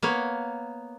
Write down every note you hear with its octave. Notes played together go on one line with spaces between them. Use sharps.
A#3 B3 C#5